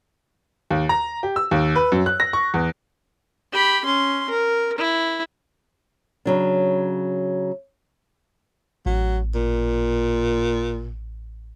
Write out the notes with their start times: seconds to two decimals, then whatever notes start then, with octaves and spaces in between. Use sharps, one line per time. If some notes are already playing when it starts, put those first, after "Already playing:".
0.70 D#2
0.89 A#5
1.23 G4
1.36 E6
1.51 D#2
1.75 B4
1.92 F#2
2.06 F#6
2.20 A#6
2.33 C#6
2.54 E2
3.52 G4 B5
3.85 C#4 C6
4.30 A#4
4.78 E4
6.25 C#3 F#3 D4
8.86 A1 F#3
9.35 A#2